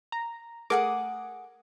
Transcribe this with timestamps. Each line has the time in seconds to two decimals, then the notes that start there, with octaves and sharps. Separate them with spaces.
0.12 A#5
0.70 A3 G#4 A#4 F#5 D6 D#6